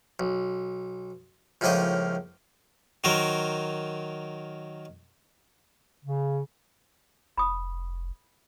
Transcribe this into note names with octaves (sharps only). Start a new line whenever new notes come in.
B1
C#2 A2 F3 A#3 D#4 D#5
D#3 F#3 A#4 C5
C#3
F1 B5 D#6